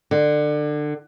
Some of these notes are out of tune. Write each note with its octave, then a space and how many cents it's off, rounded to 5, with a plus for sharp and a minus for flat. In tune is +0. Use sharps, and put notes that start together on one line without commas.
D3 +25